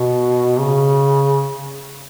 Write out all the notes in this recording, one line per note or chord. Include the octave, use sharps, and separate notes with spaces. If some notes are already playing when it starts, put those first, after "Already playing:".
Already playing: B2
C#3